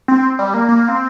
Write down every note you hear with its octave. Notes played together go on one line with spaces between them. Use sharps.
C4
G3
A#3
A#3
C4